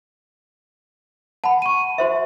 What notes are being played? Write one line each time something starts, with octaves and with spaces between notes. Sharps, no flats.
F#5 A5 B5
C#6 D#7
F#4 C5 E5